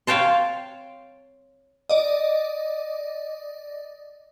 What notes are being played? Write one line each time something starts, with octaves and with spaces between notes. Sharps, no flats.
C#5 F5 G5 A5 C6
D5 D#5